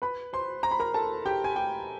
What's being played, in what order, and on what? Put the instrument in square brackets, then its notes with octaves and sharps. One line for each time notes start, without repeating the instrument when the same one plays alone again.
[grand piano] B4 B5
C5 C6
A#5
B5
A#4 A#5
A4 A5
G4 G5
G#5
G4 G5